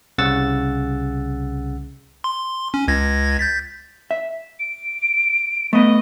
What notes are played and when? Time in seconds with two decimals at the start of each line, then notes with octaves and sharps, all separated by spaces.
0.18 C2 C#3 F#5 E6 A6
2.24 C6
2.74 C#4
2.88 C#2 G#6 A#6
3.39 G6 A6 B6
4.11 E5
4.59 D7
5.73 A3 B3 D#5